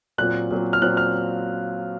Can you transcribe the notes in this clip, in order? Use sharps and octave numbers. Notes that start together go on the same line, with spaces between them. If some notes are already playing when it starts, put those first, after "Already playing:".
A#2 F#3 C4 F#6
A#2 F#3 C4
F6
A#2 F#3 C4 F#6
F6